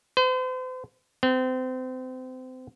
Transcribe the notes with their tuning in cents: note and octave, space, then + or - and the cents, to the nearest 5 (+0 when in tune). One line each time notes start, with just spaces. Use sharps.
C5 -40
C4 -30